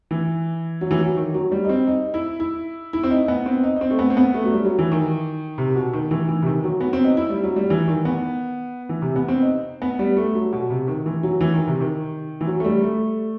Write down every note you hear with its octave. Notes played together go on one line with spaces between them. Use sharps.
E3
F#3
E3
F#3
D#3
F#3
G3
D#4
C4
D#4
E4
E4
E4
C4
D#4
B3
C4
D#4
D#4
C4
A3
B3
C4
B3
A3
F#3
G3
F#3
E3
D#3
C3
B2
D#3
E3
E3
C3
D#3
F#3
B3
C4
D#4
E4
G3
F#3
G3
E3
D#3
B3
E3
C3
B3
C4
D#4
B3
G3
A3
F#3
B2
C3
D#3
E3
F#3
E3
D#3
C3
D#3
E3
F#3
A3
G3
A3